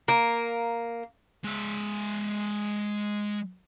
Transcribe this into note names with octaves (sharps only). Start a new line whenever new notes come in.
A#3
G#3 E5